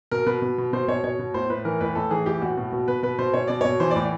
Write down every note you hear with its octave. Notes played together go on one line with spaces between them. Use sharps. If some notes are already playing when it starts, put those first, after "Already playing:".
B2 A#4
B2 B4
B2
B2
B2 C5
B2 C#5
B2 C#5
B2
A2 C5
A2 B4
E3 A#4
A2 B4
A2 A4
E3 G#4
A2 G4
A2 F#4
B2
B2
B2 B4
B2 B4
B2 C5
B2 C#5
B2 D5
B2 C#5
E3 C5
D5
A2